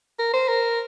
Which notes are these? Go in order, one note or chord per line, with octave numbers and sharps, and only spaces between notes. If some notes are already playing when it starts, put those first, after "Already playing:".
A#4
C5
A#4